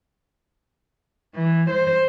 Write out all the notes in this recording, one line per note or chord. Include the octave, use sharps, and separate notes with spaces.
E3
C5